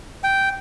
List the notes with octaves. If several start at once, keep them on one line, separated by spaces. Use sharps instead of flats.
G5